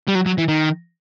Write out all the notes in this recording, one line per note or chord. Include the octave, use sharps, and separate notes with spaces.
G3
F#3
F#3
E3
D#3